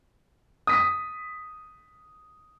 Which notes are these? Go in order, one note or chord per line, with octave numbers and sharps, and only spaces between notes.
D#6 B6